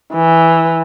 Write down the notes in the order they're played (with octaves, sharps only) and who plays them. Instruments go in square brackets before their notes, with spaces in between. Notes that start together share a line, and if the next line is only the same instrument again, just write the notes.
[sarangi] E3